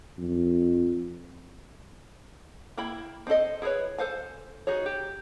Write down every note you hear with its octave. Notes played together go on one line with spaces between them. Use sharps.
F2
A#3 E4 G5 B5
C4 D#4 E4 A4 D#5
E4 G#4 A#4 B4 C#5
A4 C5 F5 G#5
D#4 F#4 G#4 C#5
G4